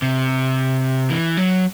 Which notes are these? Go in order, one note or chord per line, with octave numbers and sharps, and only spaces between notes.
C3
E3
F#3